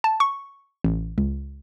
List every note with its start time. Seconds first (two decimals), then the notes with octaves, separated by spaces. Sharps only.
0.04 A5
0.20 C#6
0.84 A1
1.18 C#2